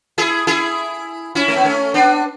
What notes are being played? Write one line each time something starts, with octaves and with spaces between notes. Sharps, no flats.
E4 G#4
E4 G#4
C#4 E4
A3
B3
A3 C#4
B3 D4